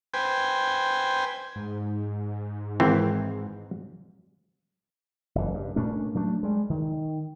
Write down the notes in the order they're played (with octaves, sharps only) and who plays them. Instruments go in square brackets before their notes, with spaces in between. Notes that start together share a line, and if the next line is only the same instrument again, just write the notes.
[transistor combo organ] B4 C5 G5 G#5
[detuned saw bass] G#2
[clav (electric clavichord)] G#1 E3 C4
[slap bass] F#1 E3
G2
A#2 A3 C#4 D4
F#3 A3 D4
G3 G#3
D#3